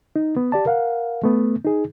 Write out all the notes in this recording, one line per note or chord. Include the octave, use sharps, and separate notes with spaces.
D#4
B3
G4 D5 A5
A#4 F5 F#5
A3 B3
D#4 G#4